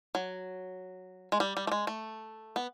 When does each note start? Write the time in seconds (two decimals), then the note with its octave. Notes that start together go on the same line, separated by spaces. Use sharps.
0.15 F#3
1.32 G#3
1.40 G3
1.57 G3
1.67 A3
1.72 G#3
1.87 A3
2.56 B3